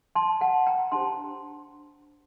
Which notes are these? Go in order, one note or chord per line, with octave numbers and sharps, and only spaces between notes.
A5 C6
F#5 A5
G5 A#5
D4 G4 C5 A5 C6